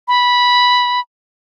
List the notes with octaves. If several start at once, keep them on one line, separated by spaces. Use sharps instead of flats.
B5